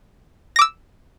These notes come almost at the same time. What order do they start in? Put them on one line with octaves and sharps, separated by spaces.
A#6 D6 E6